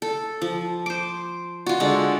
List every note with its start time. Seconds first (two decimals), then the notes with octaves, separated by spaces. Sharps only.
0.02 A4
0.42 F3
0.86 C5 D6
1.66 F4 F#4
1.80 D3 G#3